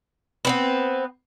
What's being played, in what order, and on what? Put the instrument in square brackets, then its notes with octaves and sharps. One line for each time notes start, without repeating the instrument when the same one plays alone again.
[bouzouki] B3 C4 B4